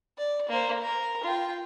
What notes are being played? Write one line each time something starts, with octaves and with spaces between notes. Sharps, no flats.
D5
A#3 C5
A#4
F4 G5